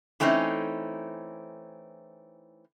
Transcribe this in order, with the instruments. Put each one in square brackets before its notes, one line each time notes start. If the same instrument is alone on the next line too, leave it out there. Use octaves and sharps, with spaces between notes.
[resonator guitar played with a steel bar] E3 A3 C4 C#4 D#4